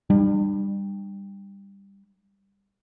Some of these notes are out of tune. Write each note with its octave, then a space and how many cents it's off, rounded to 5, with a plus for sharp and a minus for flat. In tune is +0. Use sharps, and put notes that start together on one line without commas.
G3 +15 D4 +40